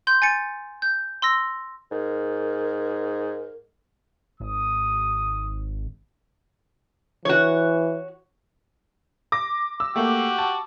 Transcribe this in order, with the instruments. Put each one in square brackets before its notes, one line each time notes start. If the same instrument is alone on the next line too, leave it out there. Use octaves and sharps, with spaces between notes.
[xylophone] C6 G6
G#5 A6 C#7
G6
C6 E6 A#6
[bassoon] G#2 [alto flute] A#4
[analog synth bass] G#1 [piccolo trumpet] D#6
[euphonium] E3 [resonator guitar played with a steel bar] F#4 C#5
[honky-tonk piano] D6 A#6
E6
[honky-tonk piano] A3 A#3 [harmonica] F#4 G4
[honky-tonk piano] A5